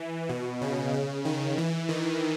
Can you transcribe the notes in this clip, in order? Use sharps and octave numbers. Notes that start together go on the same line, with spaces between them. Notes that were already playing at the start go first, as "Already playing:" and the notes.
Already playing: E3
B2
C#3
C#3
D#3
E3
D#3